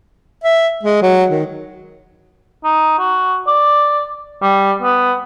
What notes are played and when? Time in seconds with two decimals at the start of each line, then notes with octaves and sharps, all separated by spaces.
0.44 E5
0.83 G#3
1.02 F#3
1.30 D#3
2.64 D#4
2.98 F#4
3.47 D5
4.42 G3
4.82 B3